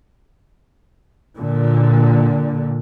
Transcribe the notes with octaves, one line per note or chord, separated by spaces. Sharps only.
A#2 D3